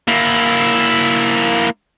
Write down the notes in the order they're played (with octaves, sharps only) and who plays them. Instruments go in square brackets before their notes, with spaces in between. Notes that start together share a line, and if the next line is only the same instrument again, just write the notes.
[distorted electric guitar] A#3 E4